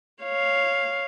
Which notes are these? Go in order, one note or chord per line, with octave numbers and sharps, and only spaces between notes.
C#5 F5